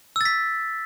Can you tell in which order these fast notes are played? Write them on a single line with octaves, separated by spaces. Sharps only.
E6 A6 B6